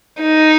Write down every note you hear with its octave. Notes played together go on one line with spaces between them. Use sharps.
D#4